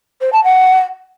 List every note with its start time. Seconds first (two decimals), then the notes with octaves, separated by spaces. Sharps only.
0.21 C5
0.33 A5
0.44 F#5